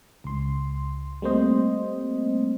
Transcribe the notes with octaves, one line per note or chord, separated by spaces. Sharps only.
C#2 C6
G3 A3 A#3 C4 C5 D#5